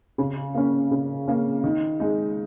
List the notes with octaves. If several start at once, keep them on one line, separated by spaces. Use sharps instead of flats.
C#3
A#3 C#4
C#3
A#3 C#4
D#3
G#3 D#4